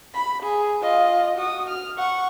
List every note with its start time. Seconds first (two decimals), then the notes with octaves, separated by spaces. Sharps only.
0.14 B5
0.43 G#4
0.82 F4 D#5
1.38 F#4 D#6
1.69 F6
1.97 F#5 C#6